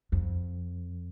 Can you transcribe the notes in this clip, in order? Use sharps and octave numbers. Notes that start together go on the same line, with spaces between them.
F2